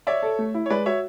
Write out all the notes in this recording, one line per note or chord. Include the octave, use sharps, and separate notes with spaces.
C#5 D5 E5
A4
A3
E4
C#5
G#3 B4 D5
F#4 C#5 E5